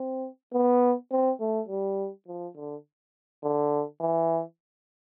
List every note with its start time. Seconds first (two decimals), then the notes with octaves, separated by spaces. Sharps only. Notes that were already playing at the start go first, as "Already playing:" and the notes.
Already playing: C4
0.54 B3
1.12 C4
1.40 A3
1.69 G3
2.27 F3
2.56 D3
3.43 D3
4.01 E3